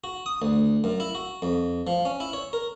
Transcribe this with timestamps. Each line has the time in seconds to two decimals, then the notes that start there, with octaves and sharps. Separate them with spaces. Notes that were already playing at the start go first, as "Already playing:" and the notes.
0.04 F#4
0.26 D#6
0.42 D2
0.84 F#2
1.00 E4
1.15 F#4
1.42 F2
1.87 F3
2.05 C#4
2.20 E4
2.33 C#5
2.53 A#4